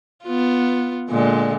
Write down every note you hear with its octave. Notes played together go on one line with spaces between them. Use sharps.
B3 F4
A#2 D3 G#3